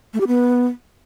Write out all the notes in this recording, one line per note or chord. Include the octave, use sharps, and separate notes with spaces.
A3
G4
B3